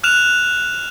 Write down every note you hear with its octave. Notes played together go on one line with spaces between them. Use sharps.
F6 F#6 E7 F7